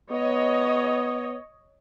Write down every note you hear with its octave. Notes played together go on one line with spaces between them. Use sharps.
B3 C#5 D#5